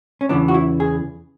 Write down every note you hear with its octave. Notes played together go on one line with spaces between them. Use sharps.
C#4
E2 C#3 E3 B3 D4
F#4
E4
G#4